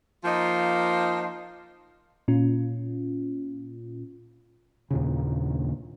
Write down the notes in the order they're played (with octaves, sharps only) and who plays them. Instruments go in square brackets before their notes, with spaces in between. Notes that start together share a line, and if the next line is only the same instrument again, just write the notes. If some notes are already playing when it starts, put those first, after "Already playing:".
[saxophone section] F3 A#3 D#4 F4 C5
[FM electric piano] A#2 C#4 F4
[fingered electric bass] D#2 A#2 C#3